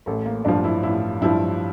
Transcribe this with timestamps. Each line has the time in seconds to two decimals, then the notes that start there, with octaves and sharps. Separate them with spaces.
0.06 A1 A3
0.26 A#3
0.45 G2 F3 D4
0.64 E4
0.83 A1 E4
1.21 G2 F3 E4